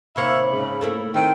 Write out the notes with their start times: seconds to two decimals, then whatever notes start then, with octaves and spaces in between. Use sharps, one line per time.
0.16 D#2 C3 A#3 C5 C#5 E5 B5
0.50 G#2 C#3
0.81 A3 A#3 E4
1.14 D#3 C4 E4 G5